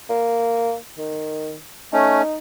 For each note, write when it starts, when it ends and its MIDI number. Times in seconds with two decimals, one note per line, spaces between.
0.10 0.75 58
0.98 1.56 51
1.93 2.22 57
1.93 2.22 61
1.93 2.37 63